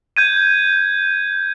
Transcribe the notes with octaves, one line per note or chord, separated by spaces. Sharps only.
G6 G#6 D#7